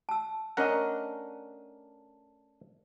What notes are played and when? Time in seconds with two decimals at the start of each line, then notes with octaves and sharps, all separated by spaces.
0.09 A5 E6
0.57 A3 C#4 D4 A#4 D#5 F#5